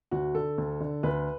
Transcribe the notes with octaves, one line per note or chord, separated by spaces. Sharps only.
D2 F#4
D3 A4
D2
D3
D2 B4